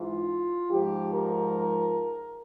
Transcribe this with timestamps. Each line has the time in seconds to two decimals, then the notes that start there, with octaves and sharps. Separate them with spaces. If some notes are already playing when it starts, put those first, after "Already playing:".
Already playing: G#2 E3 F4
0.71 G#2 F3 G4
1.11 A#4